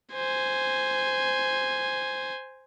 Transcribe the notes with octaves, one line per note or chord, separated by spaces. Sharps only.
C5 G#5